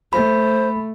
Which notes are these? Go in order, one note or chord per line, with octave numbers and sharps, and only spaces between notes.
A3 C5 B5